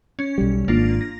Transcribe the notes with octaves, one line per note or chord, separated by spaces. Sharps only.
C#4
B1 G3
G#1 A#3 D4 F4
A#6